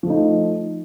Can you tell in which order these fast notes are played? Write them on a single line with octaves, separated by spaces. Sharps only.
F3 A3 D#4